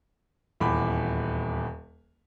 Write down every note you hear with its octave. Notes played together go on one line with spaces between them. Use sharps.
D#1 E2 B5 D6